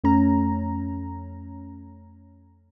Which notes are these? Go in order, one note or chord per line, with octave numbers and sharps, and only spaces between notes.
F2 A3 C#4 A#5